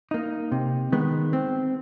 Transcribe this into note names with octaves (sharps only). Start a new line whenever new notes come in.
A#3 D#4
C3
D#3 G#3 B3
C4